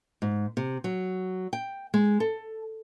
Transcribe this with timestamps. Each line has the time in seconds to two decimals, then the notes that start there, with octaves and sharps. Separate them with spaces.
0.22 G#2
0.57 C3
0.84 F#3
1.53 G5
1.94 G#3
2.20 A4